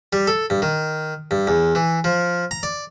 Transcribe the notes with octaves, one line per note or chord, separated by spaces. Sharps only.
G3
A4
G2
D#3
G2
E2
E3
F3
A#5
D5